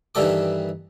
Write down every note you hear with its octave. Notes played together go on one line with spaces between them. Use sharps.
G2 D#3 E3 G3 A4 D6